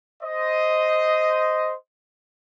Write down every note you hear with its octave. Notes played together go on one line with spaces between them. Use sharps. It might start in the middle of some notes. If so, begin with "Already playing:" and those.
C5 D#5